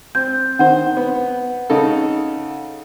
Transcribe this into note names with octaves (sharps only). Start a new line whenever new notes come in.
C4 G6
D#3 C5 F#5
B3
C#3 D#4 A4